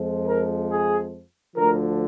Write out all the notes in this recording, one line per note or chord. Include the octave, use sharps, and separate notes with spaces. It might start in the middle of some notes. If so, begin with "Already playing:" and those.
Already playing: F2 F3 G#3
A#4
G#4
D2 D3 F3 A#4